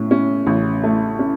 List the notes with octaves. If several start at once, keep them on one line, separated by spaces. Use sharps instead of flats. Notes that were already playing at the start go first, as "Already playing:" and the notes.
Already playing: A2 C#4
C#4
A1
A3
C#4